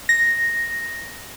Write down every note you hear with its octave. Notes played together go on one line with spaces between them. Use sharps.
A#6